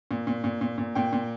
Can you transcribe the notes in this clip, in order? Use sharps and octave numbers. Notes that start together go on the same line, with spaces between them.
A#2
A#2
A#2
A#2
A#2
A#2 G5
A#2